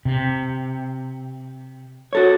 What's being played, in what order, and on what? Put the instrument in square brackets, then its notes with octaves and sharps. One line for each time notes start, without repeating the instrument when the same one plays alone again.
[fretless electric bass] C3
[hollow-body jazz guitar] F#4 A4 C#5